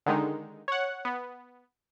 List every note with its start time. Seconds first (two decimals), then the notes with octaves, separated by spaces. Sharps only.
0.06 D3 D#3 G#3 D#4
0.68 C#5 F#5
1.05 B3